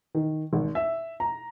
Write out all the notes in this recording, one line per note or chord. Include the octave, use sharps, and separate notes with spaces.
D#3
G#1
E5
A#5